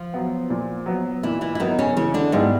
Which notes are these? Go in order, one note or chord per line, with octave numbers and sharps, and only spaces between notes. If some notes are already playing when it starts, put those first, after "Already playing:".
Already playing: F3 F4
F#3 B3
A#2
F#3 B3
A#2 E3 E4
E3 E4
E4
D#3 F#3 B3 D#4
C#3 C#4
C#3 E3 C#4
D3 D4
G#2 G3 G#3 B3 E4